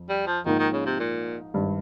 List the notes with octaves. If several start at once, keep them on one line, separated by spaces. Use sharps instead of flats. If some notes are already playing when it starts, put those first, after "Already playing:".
Already playing: F2
G3
F3
G#2 D#3 F3 A#3 D#4 A#4
D#3
C#3
C3
A#2
G#1 G2 G3